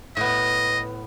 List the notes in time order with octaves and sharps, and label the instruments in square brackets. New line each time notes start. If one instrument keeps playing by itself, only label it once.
[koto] A2 B3 [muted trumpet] D#5